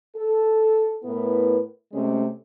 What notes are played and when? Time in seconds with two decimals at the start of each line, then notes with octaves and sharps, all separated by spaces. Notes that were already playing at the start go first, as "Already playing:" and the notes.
0.15 A4
1.03 A2 B3 E4 A#4 B4
1.93 C3 G#3 A3 C#4